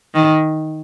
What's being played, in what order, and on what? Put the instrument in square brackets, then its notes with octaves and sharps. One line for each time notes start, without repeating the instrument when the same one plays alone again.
[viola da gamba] D#3